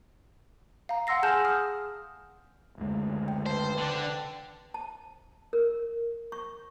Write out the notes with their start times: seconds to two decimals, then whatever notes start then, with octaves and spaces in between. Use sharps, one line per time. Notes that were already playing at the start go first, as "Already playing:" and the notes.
0.89 F5 A#5
1.07 F5 F#5 C6 E6 A#6 C7
1.23 G#4 G#5 A5 F6 G6 E7
1.45 D#6 F6
2.78 F#1 D2 G#3
3.28 G5
3.46 B4 C5 G5 A5
3.78 D3 D4
4.74 A5
5.53 A#4
6.32 C#6